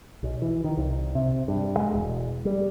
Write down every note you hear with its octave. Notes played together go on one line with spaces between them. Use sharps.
B1
E3
D#3
C2
C3
G2
G#3
E1
G3